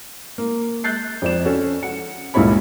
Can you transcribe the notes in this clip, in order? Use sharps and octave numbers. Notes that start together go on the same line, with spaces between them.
A#3
F#6 G6 A6 C7
F2 D5 E7
C#4 F#4 A4 C#5
F#5 C#7
C#2 G2 A#2 E4 C#5 B5